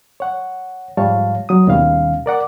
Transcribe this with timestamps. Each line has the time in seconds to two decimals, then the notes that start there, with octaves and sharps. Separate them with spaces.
0.20 C#5 F#5
0.97 G#2 F3 G3 C#5 F5 A5
1.49 F#3 D#6
1.67 D#2 B2 D#3 G3 C#4 F5
2.26 A#4 D5 F#5 D6